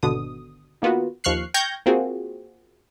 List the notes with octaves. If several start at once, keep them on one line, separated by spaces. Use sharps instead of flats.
G#1 B2 D3 D#6
D#3 A#3 B3 F4 F#4
D#2 F3 C#6 F6 F#6 C7
G5 C#6 F6 G6 G#6 A#6
A#3 C4 F4 F#4 G#4